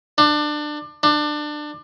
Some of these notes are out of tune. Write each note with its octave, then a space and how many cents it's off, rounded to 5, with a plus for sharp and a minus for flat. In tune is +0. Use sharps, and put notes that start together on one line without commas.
D4 +25
D4 +25